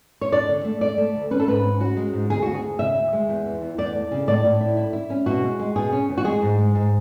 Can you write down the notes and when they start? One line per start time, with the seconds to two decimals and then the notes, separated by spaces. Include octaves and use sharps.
0.21 C#5
0.32 D4 D5
0.49 D3
0.65 A3
0.81 A3 D5
0.98 A3
1.15 D2
1.31 C#4 B4
1.40 A4
1.47 G#2 B4
1.64 C#4
1.80 C#4 F#4
1.96 G#3
2.13 G#2
2.30 D2 G#4
2.42 D2 F#4
2.55 G#4
2.63 D2
2.79 C#3 E5
2.96 D2
3.13 G#3
3.29 E2
3.46 E3
3.62 E2
3.78 E2 D5
3.95 A3
4.11 C#3
4.27 A2 D5
4.45 A2
4.61 E4
4.77 E4
4.93 E4
5.10 C#4
5.26 B2 F#4
5.42 G#3
5.59 G#3
5.76 B2 G#4
5.92 C#4
6.09 E2
6.18 F#4
6.25 G#3 G#4
6.42 G#2
6.58 G#3
6.75 G#2